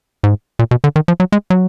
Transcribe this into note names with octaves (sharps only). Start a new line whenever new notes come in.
G#2
A#2
B2
D3
D#3
F3
F#3
G#3
F#3